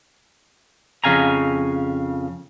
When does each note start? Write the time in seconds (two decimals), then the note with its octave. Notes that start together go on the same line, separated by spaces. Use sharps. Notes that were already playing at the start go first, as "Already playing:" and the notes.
1.04 F2 C#3 F5 G#5 A#5